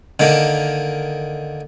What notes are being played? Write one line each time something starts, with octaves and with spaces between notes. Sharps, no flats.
D3 D#3 A#3